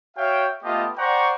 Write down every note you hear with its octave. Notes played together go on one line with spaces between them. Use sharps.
F#4 C#5 E5 F5 G5
A3 B3 F4 G4 D#5 A5
C5 D5 F#5 G5 A#5 C#6